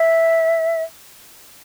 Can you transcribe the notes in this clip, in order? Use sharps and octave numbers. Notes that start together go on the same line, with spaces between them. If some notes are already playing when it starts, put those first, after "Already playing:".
Already playing: E5